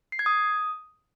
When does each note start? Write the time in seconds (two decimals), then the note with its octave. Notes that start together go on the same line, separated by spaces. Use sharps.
0.12 C7
0.19 G#6
0.26 D#6